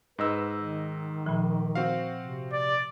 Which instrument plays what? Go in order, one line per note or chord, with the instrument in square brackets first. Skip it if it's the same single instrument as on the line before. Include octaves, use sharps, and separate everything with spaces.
[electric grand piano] G#2 D#5 E6 [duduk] B4
[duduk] D#3
[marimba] A#2 F3
[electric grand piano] C4 F#4 F5
[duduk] C3
[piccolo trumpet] D5